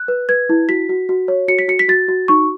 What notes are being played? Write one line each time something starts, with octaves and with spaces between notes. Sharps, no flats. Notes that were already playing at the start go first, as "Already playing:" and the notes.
Already playing: F#6
B4
B4 G#6
E4
F#4 B6
F#4
F#4
C#5
F#4 C#7
B6
F#4 C#7
B6
F#4 A6
F#4
D#4 C#6